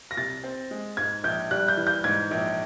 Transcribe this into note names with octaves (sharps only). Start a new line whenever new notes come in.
A#6
C2 A6
C4
G#3
G#2 G#6
A#1 G6
G3 F#6
G6
E3
G6
G#2 G#6
A#1